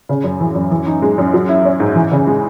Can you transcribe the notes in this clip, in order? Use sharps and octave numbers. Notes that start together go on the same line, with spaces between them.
C#3
F#2
E3
F#2
E3
D#4
G#3
F#2
F#3
E4
C#4
G#2
E3
C#3
G#3